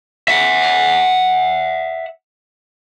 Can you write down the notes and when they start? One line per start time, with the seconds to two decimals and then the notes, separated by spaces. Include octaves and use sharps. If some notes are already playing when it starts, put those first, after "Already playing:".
0.28 E5 F#5